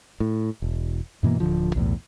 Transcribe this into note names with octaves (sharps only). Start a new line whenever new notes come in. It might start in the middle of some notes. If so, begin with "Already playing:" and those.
A2
E1
G2 B2 E3 A#3
D1 C2 D3 F3
B1 E2 A2